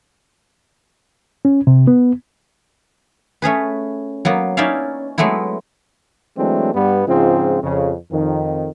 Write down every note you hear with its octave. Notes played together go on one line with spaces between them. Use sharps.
C#4
C3
B3
A3 C#4 G#4 B4
F#3 A#3 B3
C#4 D#4 E4 D5 E5 F5
F#3 G#3 A3 B3 E4
E3 F#3 G#3 A3 C4 D4
G2 G3 B3
G#2 C#3 F3 G#3 C4 F4
F2 C#3
F2 D#3